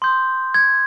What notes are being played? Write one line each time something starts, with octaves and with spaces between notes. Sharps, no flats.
C6 D#6 G6
G#6